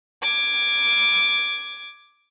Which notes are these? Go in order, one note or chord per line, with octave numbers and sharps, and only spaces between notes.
D6 G#6